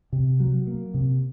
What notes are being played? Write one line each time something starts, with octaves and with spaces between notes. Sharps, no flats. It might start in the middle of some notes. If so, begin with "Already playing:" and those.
C3
F#3
A#3
C3